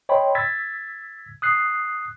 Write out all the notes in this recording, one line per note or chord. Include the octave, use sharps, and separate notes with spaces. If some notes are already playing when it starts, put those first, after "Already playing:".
C#5 D#5 G5 B5 C6
E6 G#6 A6 B6
D#6 F#6 C7